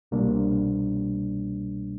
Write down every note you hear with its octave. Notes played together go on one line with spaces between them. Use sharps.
C2 B2 G3 A#3 D4